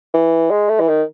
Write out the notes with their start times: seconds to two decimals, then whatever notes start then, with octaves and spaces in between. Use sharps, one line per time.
0.14 E3
0.51 G#3
0.69 A3
0.80 E3
0.88 D#3